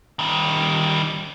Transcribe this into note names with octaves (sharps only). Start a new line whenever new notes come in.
D#3 G3